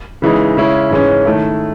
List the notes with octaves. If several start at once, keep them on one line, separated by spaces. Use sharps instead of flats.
C#3 E3 G#3 D#4
C#3 G#3 C#4 E4
G#2 E3 G#3 C#4
D#3 A3 E4